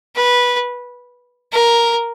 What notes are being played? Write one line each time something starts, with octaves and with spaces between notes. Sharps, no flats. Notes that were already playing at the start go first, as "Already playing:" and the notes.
B4
A#4